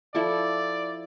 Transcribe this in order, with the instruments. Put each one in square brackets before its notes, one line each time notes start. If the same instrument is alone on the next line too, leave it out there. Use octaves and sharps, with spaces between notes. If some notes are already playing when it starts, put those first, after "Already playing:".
[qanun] F3 E4 A4 [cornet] D5